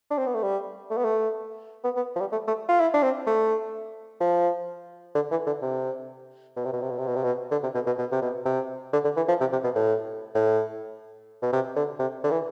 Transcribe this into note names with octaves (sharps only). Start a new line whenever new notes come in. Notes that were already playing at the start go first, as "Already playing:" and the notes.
D4
C4
B3
A3
G3
A3
B3
A3
B3
B3
F3
G3
A3
A3
F4
E4
D4
C4
A3
F3
D3
E3
D3
C3
B2
C3
B2
C3
B2
C3
B2
C3
B2
D3
C3
B2
B2
B2
C3
B2
C3
D3
D3
E3
F3
C3
C3
B2
A2
A2
B2
C3
D3
C3
D3
E3